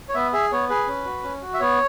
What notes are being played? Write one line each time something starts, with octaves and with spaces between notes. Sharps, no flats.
C#5
B3 E5
G#4 E5
B3 C#5
G#4 B4
C#4
F#4
C#4
F#4
E5
B3 C#5